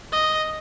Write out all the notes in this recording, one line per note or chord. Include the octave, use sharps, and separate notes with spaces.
D#5